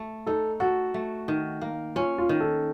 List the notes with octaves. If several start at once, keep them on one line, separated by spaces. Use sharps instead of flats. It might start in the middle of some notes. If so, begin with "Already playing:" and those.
Already playing: A3
D#4 A4
F#4 A4
A3
D#3
A#3
C#4 F4
F4
D#3
A4